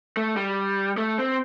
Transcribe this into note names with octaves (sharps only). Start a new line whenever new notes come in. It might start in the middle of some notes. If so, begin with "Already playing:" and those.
A3
G3
A3
C4